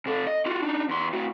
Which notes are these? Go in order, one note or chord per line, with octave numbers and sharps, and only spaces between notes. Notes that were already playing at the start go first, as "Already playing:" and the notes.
C3 A4
D#5
F4 F#4
D4 D#4
E2 C6
A2 F#4